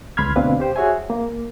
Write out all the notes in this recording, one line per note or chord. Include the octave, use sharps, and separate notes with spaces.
C#2 B5 C6 F6 G#6
D2 B2 C4 D4 B4 F5
G4 C5 G5
F#4 G#4 C#5 E5 G#5
A#3